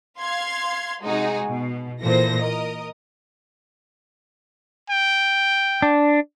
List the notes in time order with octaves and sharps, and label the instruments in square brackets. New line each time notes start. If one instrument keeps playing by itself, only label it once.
[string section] F5 C6 G#6
C3 G#3 D#4 F#4 G#4
B2
A#2 E3 A4 C5 A#6
A#4 D#5
[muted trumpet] G5
[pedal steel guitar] D4